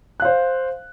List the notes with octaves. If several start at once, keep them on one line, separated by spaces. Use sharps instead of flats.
C5 F5 F#6